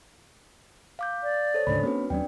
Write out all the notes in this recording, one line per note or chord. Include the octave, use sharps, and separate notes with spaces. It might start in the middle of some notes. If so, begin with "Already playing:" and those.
F5 D6 G6
D5
A4 C5 C#5
D2 G#2 C#3 D4 C#5 B5
A#3 C4 C#4 F#4 B4
D#2 F#3 C#4 D4 D5 G5